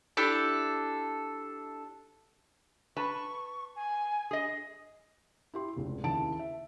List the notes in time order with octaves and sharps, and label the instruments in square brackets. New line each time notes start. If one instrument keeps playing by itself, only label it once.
[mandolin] D4 E4 G4 A4
[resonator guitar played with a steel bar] B4 A5 [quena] C#6
[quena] G#5
[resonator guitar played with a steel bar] G#4 D#5
[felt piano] E4 G4 C6
F1 C#2
D#2 C#3 E4 A5 D7
E5